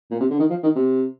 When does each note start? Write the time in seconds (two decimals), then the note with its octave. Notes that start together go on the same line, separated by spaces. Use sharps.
0.11 A#2
0.20 C3
0.30 D3
0.39 D#3
0.50 F3
0.63 D#3
0.75 C3